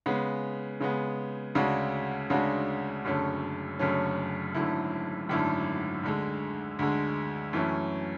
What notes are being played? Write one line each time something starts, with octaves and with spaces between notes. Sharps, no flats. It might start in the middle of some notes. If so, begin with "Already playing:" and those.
C#3 G#3 B3
C#3 G#3 B3
D2 C#3 G#3 D4 F#4
D2 C#3 G#3 D4 F#4
F#1 F#2 D3 A3 C#4
F#1 F#2 D3 A3 C#4
G#1 F#2 D3 A3 E4
G#1 F#2 D3 A3 E4
D2 D3 G#3
D2 D3 G#3
F#2 E3 A3 C#4 E4